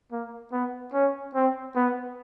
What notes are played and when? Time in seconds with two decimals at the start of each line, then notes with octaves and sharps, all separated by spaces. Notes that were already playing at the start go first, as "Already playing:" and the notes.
0.12 A#3
0.52 B3
0.93 C#4
1.35 C4
1.76 B3